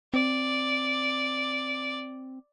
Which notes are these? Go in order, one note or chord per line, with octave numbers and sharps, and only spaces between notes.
C4 D5